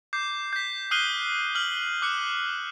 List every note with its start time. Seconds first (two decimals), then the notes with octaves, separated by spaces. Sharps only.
0.13 D6 G6 C7
0.53 G6 B6
0.91 D#6 F6 F#6 C7 D#7 G7
1.55 F6 F#7 G7
2.02 D6 F#6 C#7